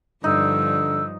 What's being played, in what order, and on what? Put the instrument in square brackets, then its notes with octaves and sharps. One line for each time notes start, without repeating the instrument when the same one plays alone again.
[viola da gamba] G2 F3 [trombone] D3 [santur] D#4 [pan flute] E6